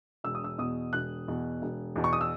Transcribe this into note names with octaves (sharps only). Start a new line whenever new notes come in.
E1 E6
D#6
E6
E2 B2 D#6
E1 F#6
E2 B2
E1
E2 B2
C#6
D#6
E6